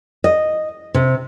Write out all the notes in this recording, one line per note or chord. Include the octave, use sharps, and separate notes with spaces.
D#5
C3